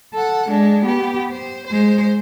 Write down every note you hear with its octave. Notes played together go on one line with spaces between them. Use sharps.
A4 F#5
G#3 D4
B3 G4
C5
G#3 C5